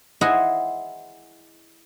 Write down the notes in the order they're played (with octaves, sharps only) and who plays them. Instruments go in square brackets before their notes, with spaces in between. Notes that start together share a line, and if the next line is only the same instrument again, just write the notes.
[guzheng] E4 G#4 C5 D#5 F#5